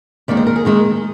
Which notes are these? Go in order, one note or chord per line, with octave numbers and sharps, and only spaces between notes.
D#2 D#3 G#3 D#4 D5
C5
A#4
G#4
D#2 D#3 G#3 D#4